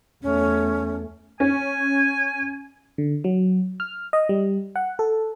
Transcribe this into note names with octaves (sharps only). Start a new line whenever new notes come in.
E2 A3 C#4
C#4 G#5
D3
F#3
F6
D#5
G3
F#5
A4